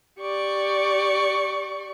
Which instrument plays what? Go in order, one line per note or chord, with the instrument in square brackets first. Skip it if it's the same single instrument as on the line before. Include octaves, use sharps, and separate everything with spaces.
[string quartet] G4 D5 C#6